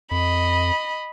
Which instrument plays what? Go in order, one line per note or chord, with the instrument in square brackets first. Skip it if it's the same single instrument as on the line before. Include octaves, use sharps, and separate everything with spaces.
[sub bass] F2 [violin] D#5 B5